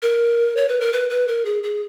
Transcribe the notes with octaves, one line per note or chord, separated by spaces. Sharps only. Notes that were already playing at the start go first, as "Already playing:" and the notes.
A#4
C#5
B4
A#4
B4
B4
A#4
G#4
G#4